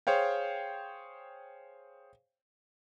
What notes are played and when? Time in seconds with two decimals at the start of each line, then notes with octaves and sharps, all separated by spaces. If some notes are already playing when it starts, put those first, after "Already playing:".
0.07 G#4 C5 C#5 F5 G5